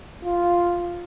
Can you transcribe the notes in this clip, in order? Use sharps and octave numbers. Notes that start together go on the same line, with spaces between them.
F4